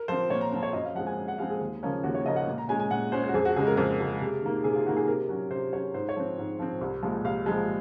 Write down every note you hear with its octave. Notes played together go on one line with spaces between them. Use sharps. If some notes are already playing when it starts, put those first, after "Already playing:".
Already playing: A#4
F3 C4 C5
A#2 C#5
A#5
F3 C4 A#5
C#5
F#2 D#5
F5
F3 G#3 C4 F#5
G#5
F#2
F#5
F3 G#3 C4 F5
G#4
D#2
C#3 F3 A#3 C#4
D#2 F#4
C#5
C#3 F3 A#3 C#4 D#5
F#5
A#2
A#5
G#3 C#4 G#5
G#5
A#2 F#5
G#3 C#4 C5
C5
F#4
F2 G#4
F#4
C#3 G#3 G#4
A#4
F2 A#4
C#3 G#3
C3
D#3 A#3
C3 G#4
F4
D#3 A#3 F#4
G#4
C3 A#4
F#3 C#4
C3 C5
F#3 C#4 C#5
G#2 C5
C#5
F3 C4
G#2
F3 C4
C2
A#2 F3 G#3
C2 F5
A#2 F3 G#3